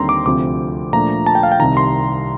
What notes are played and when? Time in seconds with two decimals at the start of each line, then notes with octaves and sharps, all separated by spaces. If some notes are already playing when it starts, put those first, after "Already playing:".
Already playing: D#2 D3 G3 C4 D#4 A#5 C6
0.09 D6
0.26 D2 C3 F3 C4 D6
0.93 A#2 F3 A3 D4 A#5
1.26 A5
1.35 G5
1.43 F5
1.52 G5
1.60 C2 C3 D#3 A#5
1.77 C6